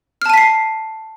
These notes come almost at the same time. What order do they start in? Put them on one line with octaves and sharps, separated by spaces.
F6 A5 D#7 B6 C7